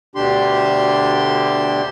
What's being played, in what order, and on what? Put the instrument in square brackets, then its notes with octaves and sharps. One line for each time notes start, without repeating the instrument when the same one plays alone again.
[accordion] D2 B2 D3 D4 G4 C6